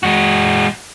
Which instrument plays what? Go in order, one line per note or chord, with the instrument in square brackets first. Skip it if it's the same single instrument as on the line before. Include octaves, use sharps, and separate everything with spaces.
[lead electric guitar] G#3 F#4